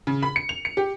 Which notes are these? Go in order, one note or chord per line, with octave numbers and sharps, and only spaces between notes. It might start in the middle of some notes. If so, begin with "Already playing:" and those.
C#3
B5
C#7
F7
C#7
G4